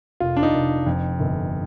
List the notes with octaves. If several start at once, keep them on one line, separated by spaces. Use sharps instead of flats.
F1 F4
D4
D#4
F1
F2
G1